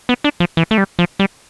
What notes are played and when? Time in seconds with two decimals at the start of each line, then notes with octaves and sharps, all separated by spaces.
0.09 B3
0.24 D4
0.40 F3
0.57 E3
0.71 A3
0.78 G3
0.99 F3
1.19 G3